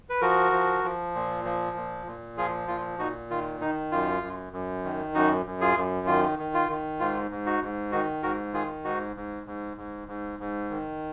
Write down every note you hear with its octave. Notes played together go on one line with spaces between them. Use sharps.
B4
F3 F#4 A#4
F3
F3
A#2
F3
A#2
A#2
F3 F4 G#4
A#2 F4
A#2 D#4 F#4
D#3 F4
D#3 D#4
F#2 F4
F#2
F#2
D#3
F#2 D#4 F#4
F#2
F4 G#4
F#2
D#3 F4
D#3
F4
D#3
G#2 F4
G#2
D#4 F#4
G#2
D#3 D#4 F#4
G#2 F#4 A#4
D#3 F4 G#4
G#2 D#4 F#4
G#2
G#2
G#2
G#2
G#2
D#3